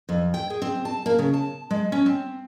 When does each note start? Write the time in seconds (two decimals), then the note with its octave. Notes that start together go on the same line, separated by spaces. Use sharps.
0.09 F2
0.34 G5
0.50 G#4
0.62 C4
0.85 A5
1.06 A#3
1.18 C#3
1.34 A5
1.71 G#3
1.92 C#4
2.06 C4